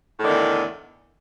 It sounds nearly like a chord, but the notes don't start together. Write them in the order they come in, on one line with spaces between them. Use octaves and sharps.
A2 D3 D#3 E2